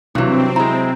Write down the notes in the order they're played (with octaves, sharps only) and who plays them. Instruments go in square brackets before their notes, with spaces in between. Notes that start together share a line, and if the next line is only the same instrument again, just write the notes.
[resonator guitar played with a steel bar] G2 E3 [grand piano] C3 F#3 [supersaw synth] C4
[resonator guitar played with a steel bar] G#3 E4 [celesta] A#5